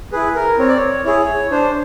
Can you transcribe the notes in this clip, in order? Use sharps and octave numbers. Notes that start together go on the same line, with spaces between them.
E4 G#4 B4
A#4
C4 C#5
D5
C#5
E4 G#4 C#5
D4 C5